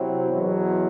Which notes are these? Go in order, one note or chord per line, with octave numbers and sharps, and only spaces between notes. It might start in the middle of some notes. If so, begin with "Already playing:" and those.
Already playing: C3 F#3 C4 E4
E2 B2 F#3